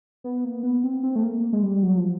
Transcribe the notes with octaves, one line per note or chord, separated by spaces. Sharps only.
B3
A#3
B3
C4
C4
A3
A#3
G#3
G3
F#3
F3